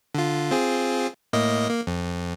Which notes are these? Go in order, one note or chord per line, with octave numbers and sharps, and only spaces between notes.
D3 F4
C4 F4 G#4
A2 A#3 D#5
A#3
F2